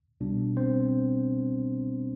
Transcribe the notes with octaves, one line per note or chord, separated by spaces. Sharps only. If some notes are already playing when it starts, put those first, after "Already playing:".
C2 B2 G3 B3 D4
C4 C5